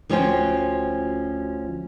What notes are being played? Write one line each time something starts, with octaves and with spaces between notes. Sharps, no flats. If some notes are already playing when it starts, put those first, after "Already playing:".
D2 F3 C#4 F#4 C5 G5